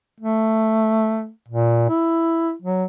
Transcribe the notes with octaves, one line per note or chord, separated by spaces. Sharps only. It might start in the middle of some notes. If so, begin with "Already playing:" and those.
A3
A#2
E4
F#3